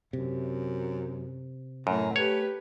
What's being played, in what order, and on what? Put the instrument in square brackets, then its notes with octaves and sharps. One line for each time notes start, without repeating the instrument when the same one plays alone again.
[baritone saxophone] F#2 [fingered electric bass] C3
[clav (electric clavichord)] F#2 [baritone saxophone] A2 [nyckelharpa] A#5
[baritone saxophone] A3 [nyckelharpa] G4 B4 [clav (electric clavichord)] C#5